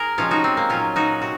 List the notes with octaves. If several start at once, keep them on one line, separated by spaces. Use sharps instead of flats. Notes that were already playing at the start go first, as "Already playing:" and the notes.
Already playing: G#4 A#4
C3 F3 G#3 C#4 F4
D#4 F#4
C4
A#3
A#2 F#3 C#4 F4
D#4 F#4
C3 F#4